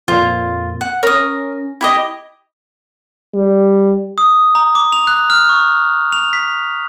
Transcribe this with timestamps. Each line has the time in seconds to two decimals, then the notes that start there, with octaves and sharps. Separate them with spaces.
0.08 F2 A#2 F4
0.81 F#5
1.03 C#4 A#4 D#6
1.81 E4 G4 D#5
3.34 G3
4.18 D#6
4.55 A#5
4.75 D6
4.92 F7
5.07 F#6
5.30 F6
5.49 C#6
6.12 F7
6.33 B6